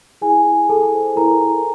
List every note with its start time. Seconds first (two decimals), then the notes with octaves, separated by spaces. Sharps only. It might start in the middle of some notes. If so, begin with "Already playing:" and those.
0.21 E4 G#4 G#5
0.46 E4
0.69 G#4 A4 A5
0.93 C5
1.16 E4 A#4 A#5
1.40 E4